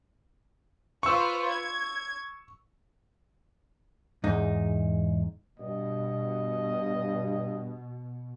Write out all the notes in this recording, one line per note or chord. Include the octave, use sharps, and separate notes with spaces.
F4 B4 C5 C#6 E6
G#6
E2 G#2 D#4
G2 B2 D#5